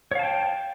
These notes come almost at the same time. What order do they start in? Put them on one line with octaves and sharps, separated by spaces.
C#5 F5 A5 G5